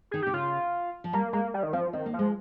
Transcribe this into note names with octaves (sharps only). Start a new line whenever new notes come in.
D#3 G#4
C3 G4
C#3 F4
F3
G3 A#3
G#3 A#3
G3
D#3
F3 C4
D#3 C4
A#3
F3
G#3